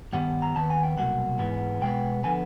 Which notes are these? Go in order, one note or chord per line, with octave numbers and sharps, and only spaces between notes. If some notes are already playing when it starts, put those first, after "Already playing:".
G2 D#3 G3 B3 F#5
A#5
D#2 D#3 B3 A5
G#5
G5
C2 B2 F#3 A#3 F#5
G#2 E3 G#3 B3
B2 G#3 B3 G5
D3 F3 B3 G#5